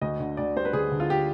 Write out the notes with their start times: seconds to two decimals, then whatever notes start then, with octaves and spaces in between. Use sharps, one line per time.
0.01 D2 D#5
0.20 D3
0.37 D2 D5
0.56 G3 C5
0.65 B4
0.73 D2 G#4
0.92 D3
1.00 F4
1.10 G4